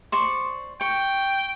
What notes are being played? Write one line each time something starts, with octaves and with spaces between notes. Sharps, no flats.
C5 D5 C#6
G5 C#6